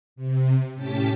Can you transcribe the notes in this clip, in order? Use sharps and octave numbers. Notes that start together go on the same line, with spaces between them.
C3
A2 C#4 G4 A5 A6 B6